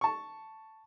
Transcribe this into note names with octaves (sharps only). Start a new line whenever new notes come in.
A5 C#6